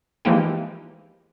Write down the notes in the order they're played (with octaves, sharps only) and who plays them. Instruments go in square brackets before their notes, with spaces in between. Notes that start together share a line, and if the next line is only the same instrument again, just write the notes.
[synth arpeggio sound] E3 F3 G#3 A#3 D#4 G4